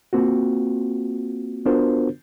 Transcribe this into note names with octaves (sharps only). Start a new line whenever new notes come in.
A#3 C4 F4 F#4
B3 D4 F4 F#4 A#4 C5